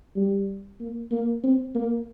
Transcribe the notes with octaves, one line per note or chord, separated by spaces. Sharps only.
G3
A#3
A#3
C4
A#3